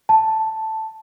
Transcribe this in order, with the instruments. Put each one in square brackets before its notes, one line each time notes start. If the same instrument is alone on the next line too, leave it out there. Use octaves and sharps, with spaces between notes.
[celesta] A5